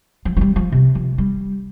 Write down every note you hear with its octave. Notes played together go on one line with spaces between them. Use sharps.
F3
F3
G3
F3
C3
F3
G3